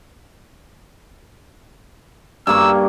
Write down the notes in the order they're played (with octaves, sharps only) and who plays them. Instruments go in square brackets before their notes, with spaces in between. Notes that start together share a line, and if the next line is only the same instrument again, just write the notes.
[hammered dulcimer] G2 A#3 C#6 [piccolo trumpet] E6